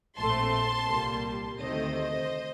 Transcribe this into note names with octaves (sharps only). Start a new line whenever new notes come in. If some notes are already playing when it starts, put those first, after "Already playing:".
A#1 A2 A3 C4 A5 C6
C2 A#2 G3 A#3
D2 C3 D#3 A3 C5 D#5